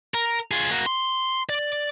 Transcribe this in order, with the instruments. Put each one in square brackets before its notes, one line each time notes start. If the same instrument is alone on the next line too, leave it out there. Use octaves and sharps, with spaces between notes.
[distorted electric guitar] A#4
F4 G#4
A#3 F#4
C6
D5